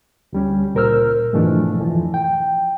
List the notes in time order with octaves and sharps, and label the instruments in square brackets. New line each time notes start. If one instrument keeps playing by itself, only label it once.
[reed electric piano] D2 G3 C#4
C#2 A#2 A#4 C5 E6 F6
G#2 B2 E3 F3 A3 D4
F2 E3 F3
G5